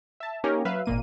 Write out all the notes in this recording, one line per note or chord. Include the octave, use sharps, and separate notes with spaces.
E5 A5
A#3 C#4 D#4 G4 A#4
F#3 B4 E5 F5
G#1 A#2 A#3 D#7